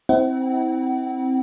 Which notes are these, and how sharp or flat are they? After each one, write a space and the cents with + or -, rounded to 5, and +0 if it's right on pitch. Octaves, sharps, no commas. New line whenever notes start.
C4 +0 E4 -30 F#5 +35